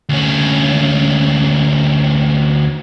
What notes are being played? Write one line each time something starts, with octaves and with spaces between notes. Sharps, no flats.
D2 C#4